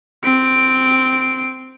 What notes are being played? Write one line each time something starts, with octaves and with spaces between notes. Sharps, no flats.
C4 D7